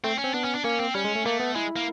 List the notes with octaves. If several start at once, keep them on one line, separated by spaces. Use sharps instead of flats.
A3 C4
C#4
C4
B3 D4
C#4
D4
A#3 C#4
C4
G3 C#4
G#3
A3
A3 A#3
B3
G#3 E4
A#3